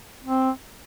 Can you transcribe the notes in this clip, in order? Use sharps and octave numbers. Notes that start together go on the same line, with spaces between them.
C4